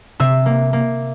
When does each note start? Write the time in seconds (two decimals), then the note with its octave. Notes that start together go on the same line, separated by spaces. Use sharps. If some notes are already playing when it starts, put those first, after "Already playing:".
0.20 C3 E5
0.46 A#3
0.73 A#3